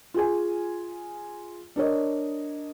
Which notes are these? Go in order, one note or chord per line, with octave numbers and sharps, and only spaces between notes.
F4 G#4 G#5
D4 A#4 C#5 D#5